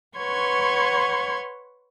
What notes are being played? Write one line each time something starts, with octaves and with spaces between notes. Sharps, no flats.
B4 C#5 F#5 C6 C#6 G#6